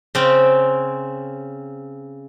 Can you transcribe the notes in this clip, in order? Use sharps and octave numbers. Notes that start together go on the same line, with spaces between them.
C#3 C4 C#4